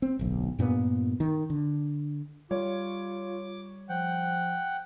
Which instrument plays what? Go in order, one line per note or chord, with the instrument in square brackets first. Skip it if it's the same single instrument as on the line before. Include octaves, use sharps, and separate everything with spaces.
[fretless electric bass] C4
D1 B1
G2 A#2 B3
D#3
D3
[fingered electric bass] G3 [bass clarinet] F4 [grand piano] C#5 [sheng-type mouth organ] D6
[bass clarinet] F3 [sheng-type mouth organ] F#5 G5